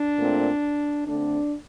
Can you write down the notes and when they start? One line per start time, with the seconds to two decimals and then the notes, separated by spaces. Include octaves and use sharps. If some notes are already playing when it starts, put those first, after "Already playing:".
Already playing: D4
0.19 A#2 A3 C4
1.07 D3 A3 C4 D4